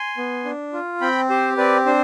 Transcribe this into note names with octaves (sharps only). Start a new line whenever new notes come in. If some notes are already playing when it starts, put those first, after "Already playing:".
Already playing: G#5 C6
B3
D4
F4
C4 G5 B5
G4 C5
C4 B4 D5
D4 C5